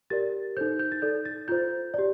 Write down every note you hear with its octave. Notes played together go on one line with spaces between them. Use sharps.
G4 A#4 D5 A6
D#4 A4 C5 G6
G6
A6
D#4 A4 D5 G6
A6
F4 C5 G6
G4 D5